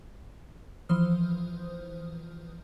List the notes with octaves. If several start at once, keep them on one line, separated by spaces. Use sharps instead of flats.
E3 F3 C5 D#6 F6